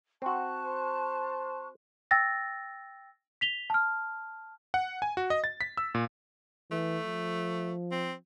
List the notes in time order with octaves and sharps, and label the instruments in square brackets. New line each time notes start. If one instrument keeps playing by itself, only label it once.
[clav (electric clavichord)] C4 F#4 [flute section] A5 C#6 F#6
[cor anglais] C5
[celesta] G5 E6 A6 A#6
B6 F7 G7
A5 F6
[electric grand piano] F#5
G#5
F#4
D#5
A6
B6
E6
A#2
[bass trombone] E3 [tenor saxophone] A3
[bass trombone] F3
[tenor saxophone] C4